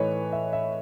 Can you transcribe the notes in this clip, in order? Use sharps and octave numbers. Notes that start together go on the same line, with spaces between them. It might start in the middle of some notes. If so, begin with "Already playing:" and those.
Already playing: A2 E3 A3 D#4 B4 C#5
E5
E5